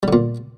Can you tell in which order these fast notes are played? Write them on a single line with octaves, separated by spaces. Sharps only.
G3 D3 A#2